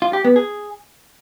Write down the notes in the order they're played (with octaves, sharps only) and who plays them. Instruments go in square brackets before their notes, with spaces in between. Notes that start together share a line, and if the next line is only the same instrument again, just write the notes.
[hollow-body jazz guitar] F4
G4
B3
G#4